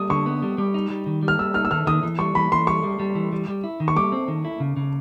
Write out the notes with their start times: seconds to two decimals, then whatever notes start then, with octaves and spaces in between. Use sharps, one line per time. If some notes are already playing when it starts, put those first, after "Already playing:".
Already playing: G3 D#6
0.10 D3 C#6
0.26 B3
0.42 G3
0.58 G3
0.74 D#4
0.90 G3
1.06 D#3
1.23 G3
1.28 F6
1.39 G3 E6
1.54 D#4 F6
1.65 E6
1.71 D#3 F6
1.87 D#3 D#6
2.03 E3
2.19 G3 C#6
2.35 E3 B5
2.52 E3 C6
2.67 G3 C#6
2.84 G3
2.99 G3
3.15 E3
3.33 G3
3.48 G3
3.64 E4
3.80 D#3
3.88 C#6
3.96 G3 D6
4.12 C4
4.28 D#3
4.45 E4
4.60 C#3
4.77 C#3